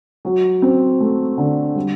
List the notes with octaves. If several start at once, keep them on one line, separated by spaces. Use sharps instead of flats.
F#3
C4
A3
D3
G3